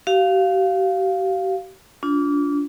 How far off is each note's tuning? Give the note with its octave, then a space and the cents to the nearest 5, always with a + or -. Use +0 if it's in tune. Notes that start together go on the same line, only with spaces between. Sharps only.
G4 -45 F5 +0
D4 -30 F4 +0